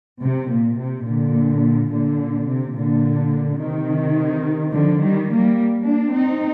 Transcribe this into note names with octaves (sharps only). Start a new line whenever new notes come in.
C3
A#2
C3
A#2 D3
A#2 D3
C3
A#2 D3
C3 D#3
D3 F3
D#3 G3
G3 A#3
A#3 D4
C4 D#4